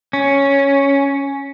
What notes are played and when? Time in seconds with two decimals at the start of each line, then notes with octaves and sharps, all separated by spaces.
0.13 C#4